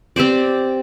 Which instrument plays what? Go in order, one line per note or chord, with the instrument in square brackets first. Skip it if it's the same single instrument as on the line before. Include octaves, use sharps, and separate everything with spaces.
[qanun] C4 G4 C5 D5